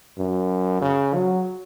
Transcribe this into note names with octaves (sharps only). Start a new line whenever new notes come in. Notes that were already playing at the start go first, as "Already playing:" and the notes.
F#2
C#3
F#3